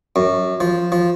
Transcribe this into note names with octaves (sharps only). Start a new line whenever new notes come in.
F#2
F3
F3